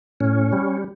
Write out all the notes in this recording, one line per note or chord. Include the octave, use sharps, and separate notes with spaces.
A2 C#4
G3